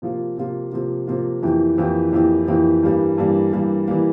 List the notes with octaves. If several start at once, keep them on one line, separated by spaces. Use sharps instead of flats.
C3 F3 A#3 F4
C3 F3 A#3 F4
C3 F3 A#3 F4
C3 F3 A#3 F4
F2 E3 A#3 E4 G4
F2 E3 A#3 E4 G4
F2 E3 A#3 E4 G4
F2 E3 A#3 E4 G4
G2 E3 G3 A#3
G2 E3 G3 A#3
G2 E3 G3 A#3
E3 G3 A#3